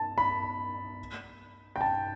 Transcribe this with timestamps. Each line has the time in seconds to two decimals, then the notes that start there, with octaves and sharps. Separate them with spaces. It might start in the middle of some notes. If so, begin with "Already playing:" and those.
Already playing: A5
0.18 B5
1.76 G5
1.81 A5